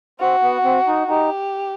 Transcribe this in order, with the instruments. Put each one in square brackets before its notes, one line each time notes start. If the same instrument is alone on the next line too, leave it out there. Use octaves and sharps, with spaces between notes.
[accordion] C4 [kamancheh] F#4
[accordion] B3
C4
D#4
[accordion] D#4 [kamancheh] G4